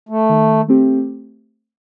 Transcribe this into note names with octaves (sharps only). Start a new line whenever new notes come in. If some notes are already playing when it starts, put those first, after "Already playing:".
A3
D#3
A3 C4 G4